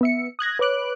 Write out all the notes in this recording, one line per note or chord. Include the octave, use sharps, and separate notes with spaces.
B3 E5 C#7
D#6 F#6 G#6 A#6
B4 C#5 D6 F#6 D7